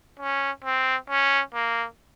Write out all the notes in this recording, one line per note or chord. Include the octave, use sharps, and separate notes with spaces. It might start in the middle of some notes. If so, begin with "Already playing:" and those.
C#4
C4
C#4
A#3